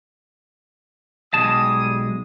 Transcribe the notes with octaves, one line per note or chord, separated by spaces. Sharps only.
B1 G3 G#3 A5 D#6